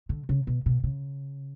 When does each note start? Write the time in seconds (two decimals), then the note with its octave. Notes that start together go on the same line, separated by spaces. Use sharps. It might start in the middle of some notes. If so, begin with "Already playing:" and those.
0.09 D3
0.29 C#3
0.47 B2
0.66 B2
0.84 C#3